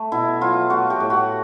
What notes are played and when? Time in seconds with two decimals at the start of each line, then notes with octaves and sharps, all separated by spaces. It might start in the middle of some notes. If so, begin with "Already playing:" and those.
Already playing: A3
0.12 B2 E4
0.41 F#3 F4
0.70 A3 F#4
0.90 G4
1.00 A2
1.10 F#4